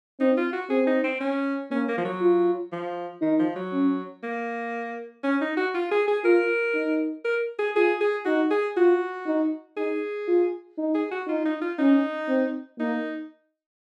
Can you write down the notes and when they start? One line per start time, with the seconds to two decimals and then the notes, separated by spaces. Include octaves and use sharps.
0.20 C4 D#4
0.37 F4
0.53 F#4
0.69 C4 G#4
0.87 D#4
1.03 C4
1.20 C#4
1.71 A#3 C#4
1.88 A#3
1.98 F3
2.05 F#3
2.21 F4
2.72 F3
3.21 D#3 D#4
3.39 F3
3.55 F#3
3.72 C#4
4.23 A#3
5.24 C#4
5.41 D#4
5.57 F#4
5.74 F4
5.91 G#4
6.08 G#4
6.24 F4 A#4
6.74 D#4
7.25 A#4
7.59 G#4
7.76 F4 G#4
8.00 G#4
8.25 D#4 F#4
8.50 G#4
8.77 F4 F#4
9.27 D#4
9.77 D#4 G#4
10.28 F4
10.78 D#4
10.94 G#4
11.11 F#4
11.27 D#4 F4
11.45 D#4
11.61 F4
11.78 C#4 D#4
12.28 C4
12.80 A#3 D#4